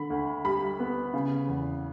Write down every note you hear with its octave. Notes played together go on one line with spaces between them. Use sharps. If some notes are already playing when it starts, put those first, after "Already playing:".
Already playing: D3 B5
D2
G3 B5
B3
C#3
E2